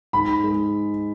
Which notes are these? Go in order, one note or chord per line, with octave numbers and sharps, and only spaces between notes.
G#2 B5
G#3